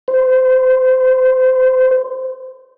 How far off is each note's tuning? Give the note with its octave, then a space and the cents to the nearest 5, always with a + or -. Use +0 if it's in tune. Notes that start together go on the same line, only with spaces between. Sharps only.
C5 -25